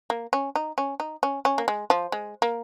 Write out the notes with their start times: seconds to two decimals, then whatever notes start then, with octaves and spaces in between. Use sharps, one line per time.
0.10 A#3
0.33 C#4
0.55 D#4
0.78 C#4
1.00 D#4
1.23 C#4
1.45 C#4
1.58 A#3
1.68 G#3
1.90 F3
2.12 G#3
2.42 A#3